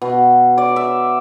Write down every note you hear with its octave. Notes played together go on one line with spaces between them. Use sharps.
B2
D5
E5